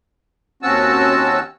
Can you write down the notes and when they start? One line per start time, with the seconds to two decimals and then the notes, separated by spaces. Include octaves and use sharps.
0.63 D#2 C4 C#4 F#4 A5 E6